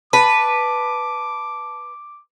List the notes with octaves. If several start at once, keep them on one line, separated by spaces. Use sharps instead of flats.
B4 A5 D6